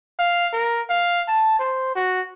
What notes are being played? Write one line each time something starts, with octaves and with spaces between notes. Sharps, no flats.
F5
A#4
F5
A5
C5
F#4